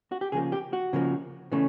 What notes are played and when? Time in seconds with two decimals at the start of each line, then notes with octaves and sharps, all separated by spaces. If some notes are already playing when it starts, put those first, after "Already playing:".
0.12 F#4
0.21 G4
0.32 C#3 F3 A#3 G#4
0.52 G4
0.73 F#4
0.93 C#3 F3 A#3
1.52 C#3 E3 A3 C#4